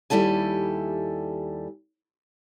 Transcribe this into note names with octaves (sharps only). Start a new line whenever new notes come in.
D#2 G3 E4 A4 G#5